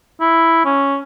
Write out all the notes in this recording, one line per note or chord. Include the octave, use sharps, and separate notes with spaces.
E4
C#4